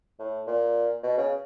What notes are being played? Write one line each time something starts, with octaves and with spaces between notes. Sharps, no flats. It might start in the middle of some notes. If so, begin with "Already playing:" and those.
A2
A#2
B2
C#3